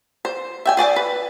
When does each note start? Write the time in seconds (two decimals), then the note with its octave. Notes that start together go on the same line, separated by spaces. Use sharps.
0.25 C5
0.65 E5 G5 G#5
0.77 G#4 D5 G#5 A5
0.96 B4